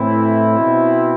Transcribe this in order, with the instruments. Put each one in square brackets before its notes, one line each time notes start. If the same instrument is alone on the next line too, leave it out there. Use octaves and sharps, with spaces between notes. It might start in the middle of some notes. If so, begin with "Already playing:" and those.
Already playing: [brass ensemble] A2 E3 C4 E4
B2